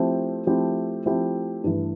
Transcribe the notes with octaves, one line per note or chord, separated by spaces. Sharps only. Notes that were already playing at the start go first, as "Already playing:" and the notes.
Already playing: F3 A3 C4 E4 G4
F3 A3 C4 E4 G4
F3 A3 C4 E4 G4
G2 E3 A3